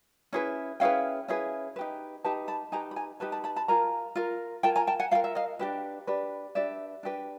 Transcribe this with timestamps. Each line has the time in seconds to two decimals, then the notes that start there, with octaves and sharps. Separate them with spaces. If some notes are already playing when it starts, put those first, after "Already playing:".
0.33 C#4 E4 G#4 B4
0.80 C#4 E4 G#4 B4 F5 G5
1.28 C#4 E4 G#4 B4
1.76 D#4 G4 B4
2.24 D#4 G4 B4 G5 A5
2.48 A5 B5
2.72 D#4 G4 B4 G#5 A#5
2.91 B5
2.96 G#5 A#5
3.20 D#4 G4 B4 A5 B5
3.32 A5 B5
3.44 A5 B5
3.56 A5 B5
3.68 F4 A#4 G#5 A#5
4.15 F4 A#4
4.63 F4 A#4 G5 A5
4.76 G#5 A#5
4.87 G5 A5
5.00 F#5 G#5
5.11 F4 F5 G5
5.15 A#4
5.24 E5
5.35 D#5 F5
5.59 D4 G4 B4
6.07 D4 G4 B4
6.55 D4 G4 B4 D5 E5
7.03 D4 G4 B4